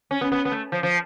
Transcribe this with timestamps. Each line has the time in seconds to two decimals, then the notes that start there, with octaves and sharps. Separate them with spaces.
0.11 C#4
0.21 B3
0.32 B3
0.45 B3
0.52 A3
0.72 F3
0.83 F3